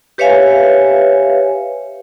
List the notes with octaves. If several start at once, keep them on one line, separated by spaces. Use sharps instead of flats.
G4 B4 C#5 E5 F5 G#5